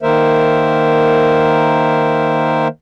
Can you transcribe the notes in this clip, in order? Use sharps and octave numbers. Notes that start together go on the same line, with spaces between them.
D#3 A#3 A#4 C5 E5